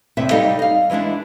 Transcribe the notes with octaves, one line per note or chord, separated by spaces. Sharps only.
E2 C3 E5
G3 D#4 G4 A4 D#5 F5
D#5 F5
E3 G3 G#3 D4 E4